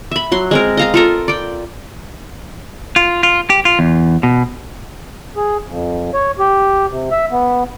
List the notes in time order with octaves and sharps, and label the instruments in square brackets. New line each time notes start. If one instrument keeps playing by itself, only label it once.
[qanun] E5 B5
F#3 C6
G#3 C4 A#4
D#5 F5 A#5
F4 A4 A#4
D5 G5
[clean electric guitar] F4
F4
G4
F4
E2
B2
[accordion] G#4
F2
C#5
G4
C3
E5
B3